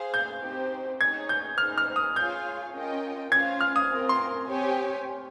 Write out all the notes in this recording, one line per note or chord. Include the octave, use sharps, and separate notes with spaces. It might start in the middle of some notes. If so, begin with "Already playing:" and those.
Already playing: G#4 C5 F5
G6
C4 D#4 G4 C5
D#4 G#4 C#5 G#6
G6
D#4 G#4 C5 F6
F6
D#6
F4 G#4 C#5 F5 G#5 G6
C#4 F4 A#4 D#5 G5
C#4 F4 C5 F5 G#6
F6
D#6
C4 F4 A#4
C6
C4 G4 C#5 G#5